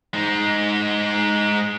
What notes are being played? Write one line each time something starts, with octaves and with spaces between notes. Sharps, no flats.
G#3 D#4